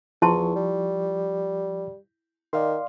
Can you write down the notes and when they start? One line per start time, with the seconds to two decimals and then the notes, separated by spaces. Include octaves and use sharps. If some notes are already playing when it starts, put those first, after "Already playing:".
0.22 E2 F3 E4 A5 C6 C#6
0.56 G3
2.53 D#3 D5 F5 C6